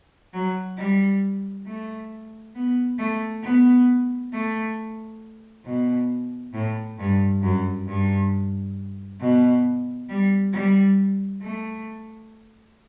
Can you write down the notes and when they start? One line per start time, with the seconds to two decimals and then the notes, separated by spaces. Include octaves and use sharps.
0.33 F#3
0.77 G3
1.66 A3
2.55 B3
2.99 A3
3.43 B3
4.33 A3
5.65 B2
6.53 A2
6.99 G2
7.42 F#2
7.87 G2
9.20 B2
10.09 G3
10.53 G3
11.42 A3